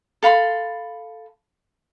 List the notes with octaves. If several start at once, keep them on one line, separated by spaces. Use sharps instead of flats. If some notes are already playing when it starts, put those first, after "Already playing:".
A4 F5 B5 C6